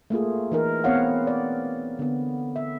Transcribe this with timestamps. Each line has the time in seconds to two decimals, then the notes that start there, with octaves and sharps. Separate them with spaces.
0.10 A3 A#3 F4 G#4
0.52 E3 D#4 A#4
0.84 B3 C4 C#5 F5 F#5
1.27 D5
1.99 D3 B3
2.56 E5